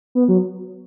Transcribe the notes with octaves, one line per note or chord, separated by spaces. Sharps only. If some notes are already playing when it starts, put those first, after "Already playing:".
B3
F#3